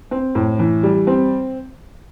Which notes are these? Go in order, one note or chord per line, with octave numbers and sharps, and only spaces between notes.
C4
A2
E3
G3
C4